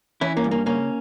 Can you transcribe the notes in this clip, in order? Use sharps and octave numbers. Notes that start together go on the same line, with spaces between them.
E3 C#4 E4
A#3 C#4
G2
A#3 C#4
C#3 A#3 C#4